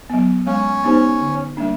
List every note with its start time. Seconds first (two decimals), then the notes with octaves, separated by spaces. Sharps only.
0.10 F#3 B3
0.46 G#3 C#4
0.84 B3 D#4 G4 C5
1.21 D3
1.57 G3 A#3 D4